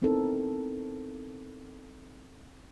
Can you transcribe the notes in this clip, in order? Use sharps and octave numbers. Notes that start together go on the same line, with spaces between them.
B3 C4 D#4 E4 A4 A#4